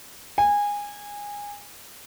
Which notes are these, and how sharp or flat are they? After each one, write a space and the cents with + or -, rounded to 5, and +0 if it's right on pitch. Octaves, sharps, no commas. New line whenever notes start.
G#5 -20